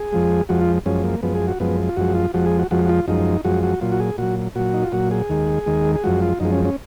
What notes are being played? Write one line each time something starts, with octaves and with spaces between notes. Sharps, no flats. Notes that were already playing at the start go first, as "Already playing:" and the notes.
Already playing: G#4
F2 F3 G#3
F2 F3 G#3 F#4
F4
F#2 F3 G#3 C#4
A#3
F#2 F3 G#3 B3
G#4
F#4
F#2 F3 G#3 B3
F4
F#2 F3 G#3 F#4
F4
F2 F3 G#3 F#4
G#4
F#4
F2 F3 G#3 F#4
F#4
F4
F#2 F3 G#3 D#4
F#2 F3 G#3 F#4
F#4
A#2 F#3 F4
F#4
G#4
A#2 F#3 F#4
A#2 F#3 F#4
D#4
F4
A#2 F#3 F#4
G#4
D#2 D#3 G#3
D#2 D#3 G#3
G#4
F#2 F3 G#3 F#4
F4
F#2 F3 G#3 D#4
C#4
C#4